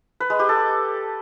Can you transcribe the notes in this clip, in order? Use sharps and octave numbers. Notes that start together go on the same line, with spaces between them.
B4
G#3
G4
A4